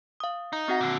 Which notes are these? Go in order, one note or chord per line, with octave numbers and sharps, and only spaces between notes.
F5 D#6
D#4
C4 F#4 F#5
A#2 D3